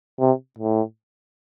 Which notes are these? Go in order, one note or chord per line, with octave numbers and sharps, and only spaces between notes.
C3
A2